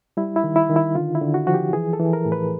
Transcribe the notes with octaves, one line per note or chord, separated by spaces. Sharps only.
G3 E4
E4
D#3
E4
D#3
E4
D3 F4
E4
D3
F#4
F3 F#4
G4
E3 G#4
A4
E3
A#4
A2
B4